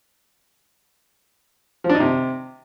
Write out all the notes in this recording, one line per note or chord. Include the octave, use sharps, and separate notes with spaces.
F3
D4
D#4
C3